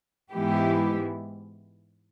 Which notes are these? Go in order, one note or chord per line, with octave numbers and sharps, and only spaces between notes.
G#2 E3 G#3 B3 E4 G4